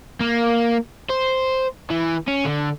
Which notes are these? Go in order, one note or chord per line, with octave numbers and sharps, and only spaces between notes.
A#3
C5
E3
C#4
D3